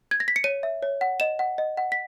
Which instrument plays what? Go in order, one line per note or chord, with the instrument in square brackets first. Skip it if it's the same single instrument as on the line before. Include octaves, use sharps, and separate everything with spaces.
[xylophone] G#6
A#6
B6
C#7
C#5 D#7
E5
C#5
F#5
D#5 E7
F#5
D#5
F#5
B6